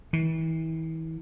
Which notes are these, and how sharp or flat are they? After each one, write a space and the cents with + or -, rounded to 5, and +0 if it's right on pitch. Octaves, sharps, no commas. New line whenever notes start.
E3 -35